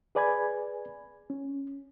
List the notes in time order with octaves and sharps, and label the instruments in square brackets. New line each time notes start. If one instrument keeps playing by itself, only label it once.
[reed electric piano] G#4 B4 D5 G#5 B5 G#6
C#4